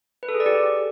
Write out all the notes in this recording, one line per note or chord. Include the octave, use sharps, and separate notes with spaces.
B4
A4
G#4
D5
G4